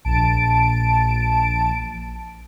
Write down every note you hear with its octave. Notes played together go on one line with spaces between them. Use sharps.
A#1 A5 D7